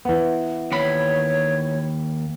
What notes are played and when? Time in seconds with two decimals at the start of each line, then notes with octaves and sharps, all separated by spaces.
0.05 E3 B3
0.72 D#2 C#5 B5